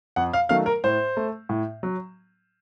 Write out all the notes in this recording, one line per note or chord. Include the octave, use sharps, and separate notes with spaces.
F2 F#5
F5
D#3 F#3 A3 F5
A#4
A2 C5
A3
A2
F#3